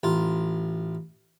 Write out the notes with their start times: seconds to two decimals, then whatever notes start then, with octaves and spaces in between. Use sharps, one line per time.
0.03 A1 F4